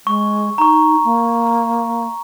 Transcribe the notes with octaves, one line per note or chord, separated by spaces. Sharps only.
G#3 C#6
D#4 A#5 C#6
A#3